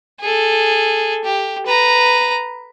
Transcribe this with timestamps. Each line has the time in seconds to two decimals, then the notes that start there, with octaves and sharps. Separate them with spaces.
0.20 G#4 A4
1.24 G4
1.66 B4 A#5